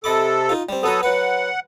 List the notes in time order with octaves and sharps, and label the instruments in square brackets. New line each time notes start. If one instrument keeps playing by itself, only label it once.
[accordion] C3 A4 [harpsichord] D#5 B5 D6
[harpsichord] D#4 F4
G3 C4
[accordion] F#3 A4 D#6 [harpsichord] B3 B4 A#5
[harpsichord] F#3 B4 [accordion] F#5